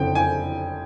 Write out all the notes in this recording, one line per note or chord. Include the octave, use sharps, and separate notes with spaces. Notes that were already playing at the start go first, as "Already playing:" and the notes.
Already playing: F#1 F2 D3 G5
G#5